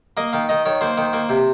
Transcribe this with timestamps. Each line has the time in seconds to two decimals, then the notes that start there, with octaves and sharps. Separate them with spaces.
0.17 A#3 D#5
0.33 D#3 F5
0.49 D#3 D#5
0.66 D#3 C#5
0.81 A#3 C5
0.98 D#3
1.13 A#3
1.29 C3